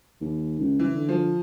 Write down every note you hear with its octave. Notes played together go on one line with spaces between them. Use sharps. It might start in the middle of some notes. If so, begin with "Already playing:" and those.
D#2
C#2
E3
D3
F3